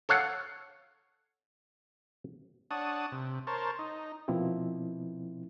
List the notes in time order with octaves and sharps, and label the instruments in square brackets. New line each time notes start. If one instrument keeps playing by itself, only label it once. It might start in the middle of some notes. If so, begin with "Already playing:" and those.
[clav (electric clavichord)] A4 C#5 F5 F#5
[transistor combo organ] D4 C#5 F#5 A5 D#6
C3
A#4 C5 C#5 A5
D#4
[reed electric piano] B2 F3 A#3 C4 E4